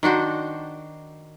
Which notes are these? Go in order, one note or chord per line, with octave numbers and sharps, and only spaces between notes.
D#3 D4 F#4 C5